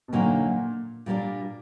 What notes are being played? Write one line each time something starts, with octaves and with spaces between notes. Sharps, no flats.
B2
F2 A#2 D3 F#3 A#3 D#4
A#2 G3 A#3 D4